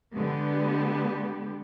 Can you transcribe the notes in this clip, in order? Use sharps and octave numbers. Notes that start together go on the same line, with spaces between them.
D3 G#3 B3 G4